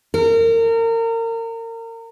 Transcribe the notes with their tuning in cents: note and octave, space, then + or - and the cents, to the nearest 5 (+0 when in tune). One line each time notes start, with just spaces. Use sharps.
A#4 -30